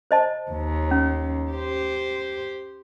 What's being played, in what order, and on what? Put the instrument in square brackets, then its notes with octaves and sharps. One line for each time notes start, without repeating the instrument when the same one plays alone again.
[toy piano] C5 D#5 A5
[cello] D#2
[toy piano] C#4
[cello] G4 C5